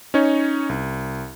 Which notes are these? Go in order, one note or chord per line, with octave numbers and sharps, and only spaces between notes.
C#4 D#4 C#5
C2